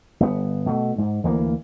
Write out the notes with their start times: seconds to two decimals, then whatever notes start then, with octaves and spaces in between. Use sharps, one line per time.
0.20 G1 B3
0.66 B2 A3
0.98 G#2
1.24 D2 E3 A#3